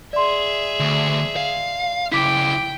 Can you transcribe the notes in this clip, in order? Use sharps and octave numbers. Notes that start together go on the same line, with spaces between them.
G#4 D5 E5 C6
D2
F5
C#3 E4 G5 D6 B6